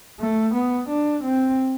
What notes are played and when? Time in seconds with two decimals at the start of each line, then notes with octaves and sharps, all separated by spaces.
0.20 A3
0.54 B3
0.89 D4
1.23 C4